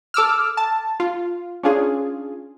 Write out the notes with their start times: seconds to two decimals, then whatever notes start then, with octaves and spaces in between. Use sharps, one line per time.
0.14 A4 D6 E6 F6
0.57 A5
1.00 F4
1.63 C#4 D4 F4 G#4